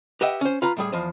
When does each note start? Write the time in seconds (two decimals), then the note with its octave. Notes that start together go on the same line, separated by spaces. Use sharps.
0.21 G4 B4 D#5 E5 F#5 G5
0.41 C#4 C5
0.62 F4 B4 A#5 B5
0.77 A2 G3 G#4
0.92 E2 F3 C5 D#5